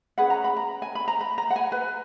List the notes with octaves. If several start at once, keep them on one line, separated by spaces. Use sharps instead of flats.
C#4 G#4 B4 F#5
A#5
B5
A#5
G#5
B5
A#5
B5
A#5
F#5
G#5
B4